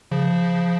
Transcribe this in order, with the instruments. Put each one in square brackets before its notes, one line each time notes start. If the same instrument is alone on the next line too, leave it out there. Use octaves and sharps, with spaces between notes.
[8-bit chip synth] C#3 F3